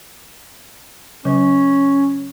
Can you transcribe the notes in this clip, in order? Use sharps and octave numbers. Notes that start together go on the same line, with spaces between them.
C#3 F#3 C#4